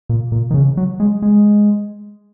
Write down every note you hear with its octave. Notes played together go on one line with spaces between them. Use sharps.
A#2
A#2
D#3
C#3
F#3
G#3
G#3